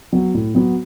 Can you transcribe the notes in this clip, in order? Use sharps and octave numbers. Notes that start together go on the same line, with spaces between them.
F#3 B3 F#4
A2
F#3 B3 F#4